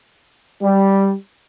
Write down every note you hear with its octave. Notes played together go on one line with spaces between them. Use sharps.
G3